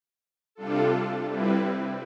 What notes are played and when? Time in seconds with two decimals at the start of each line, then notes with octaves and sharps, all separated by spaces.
0.55 C3 G3 D4 F4 A4
1.26 G3 C4 E4 B4